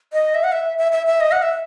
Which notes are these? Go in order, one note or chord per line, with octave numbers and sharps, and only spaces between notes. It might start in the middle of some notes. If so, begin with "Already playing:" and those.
D#5
E5
F#5
E5
E5
E5
E5
D#5
F#5
E5